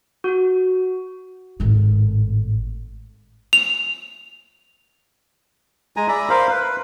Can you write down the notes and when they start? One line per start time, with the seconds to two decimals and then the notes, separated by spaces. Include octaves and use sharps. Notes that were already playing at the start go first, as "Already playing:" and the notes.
0.24 F#4
1.60 G#1 A2
3.53 F7
5.97 G#3 G#5 A#5
6.08 D5 E5 A#5 B5
6.30 A#4 C5 F5 B5
6.50 B4